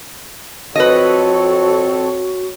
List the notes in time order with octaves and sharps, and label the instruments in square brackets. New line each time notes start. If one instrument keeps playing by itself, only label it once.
[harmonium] F2 C4 A4 [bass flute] F#4 [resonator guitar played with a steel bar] B4 D#5 [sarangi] C#5